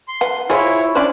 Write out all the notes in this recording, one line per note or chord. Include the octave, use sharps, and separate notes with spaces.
C6
B4 F#5
E4 F4 G#4 C5 C#5
C#4 D4 C5 D5 F#6